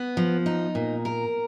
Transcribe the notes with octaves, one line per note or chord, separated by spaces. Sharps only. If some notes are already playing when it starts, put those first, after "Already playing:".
Already playing: B3
F3
D#4
A#2
A#4